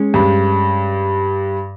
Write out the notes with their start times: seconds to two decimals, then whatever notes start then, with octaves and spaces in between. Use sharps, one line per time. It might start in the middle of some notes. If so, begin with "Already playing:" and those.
Already playing: G#3 C#4
0.14 G2